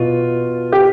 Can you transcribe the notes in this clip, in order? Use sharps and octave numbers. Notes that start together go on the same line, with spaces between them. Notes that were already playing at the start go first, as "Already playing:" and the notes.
Already playing: B2 F4
G4